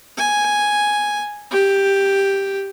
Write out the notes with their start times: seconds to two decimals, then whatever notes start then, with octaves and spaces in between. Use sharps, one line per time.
0.17 G#5
1.51 G4